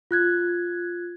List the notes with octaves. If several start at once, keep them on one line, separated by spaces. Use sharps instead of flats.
F4 F#6 G#6